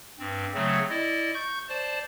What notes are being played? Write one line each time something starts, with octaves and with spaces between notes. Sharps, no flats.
G2 C4
C#3 F#3 A3 C4
E4 D5 D#5
C#6 G6
C5 D5 A5